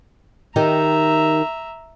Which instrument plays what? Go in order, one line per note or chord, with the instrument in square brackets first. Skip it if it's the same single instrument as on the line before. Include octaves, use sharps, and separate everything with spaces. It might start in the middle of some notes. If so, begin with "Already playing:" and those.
[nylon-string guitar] D#3 D#4 G4 [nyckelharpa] E5 A#5